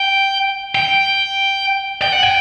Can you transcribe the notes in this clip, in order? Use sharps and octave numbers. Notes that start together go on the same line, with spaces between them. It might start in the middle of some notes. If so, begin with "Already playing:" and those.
Already playing: G5
G5
G5
F#5
G5